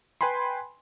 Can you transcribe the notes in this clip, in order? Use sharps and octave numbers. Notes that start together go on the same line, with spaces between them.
B4 G5 G#5 B5 C6